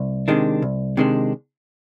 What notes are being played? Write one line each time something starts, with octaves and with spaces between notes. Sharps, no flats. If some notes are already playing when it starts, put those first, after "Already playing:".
Already playing: C2
C3 D#3 G#3 D4
C2
C3 D#3 G#3 D4